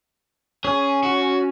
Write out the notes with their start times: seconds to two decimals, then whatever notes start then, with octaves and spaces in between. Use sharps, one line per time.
0.64 C#4 G#4
1.03 F#4